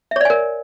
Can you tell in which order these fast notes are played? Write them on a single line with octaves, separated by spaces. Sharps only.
E5 C#5 D5 G#5 A#4